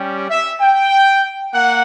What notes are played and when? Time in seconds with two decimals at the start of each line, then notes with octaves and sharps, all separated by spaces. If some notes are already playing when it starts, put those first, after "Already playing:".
Already playing: G3 C#4 G4
0.30 E5
0.60 G5
1.53 A#3 F#5